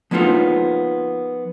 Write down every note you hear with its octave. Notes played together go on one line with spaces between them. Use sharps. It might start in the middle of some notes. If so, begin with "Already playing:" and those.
F3 A#3 B3 D#4 F4